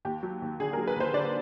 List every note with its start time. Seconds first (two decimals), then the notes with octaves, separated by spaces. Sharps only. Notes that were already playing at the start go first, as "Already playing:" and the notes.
0.05 D#2 G4
0.23 F#3
0.42 D#2
0.60 D3 G#4
0.73 A#4
0.77 F#3
0.87 B4
0.96 D#2 C5
1.14 D3 D5